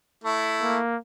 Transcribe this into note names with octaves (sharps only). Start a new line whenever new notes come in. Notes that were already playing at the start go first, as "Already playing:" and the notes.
A3 E4
A#3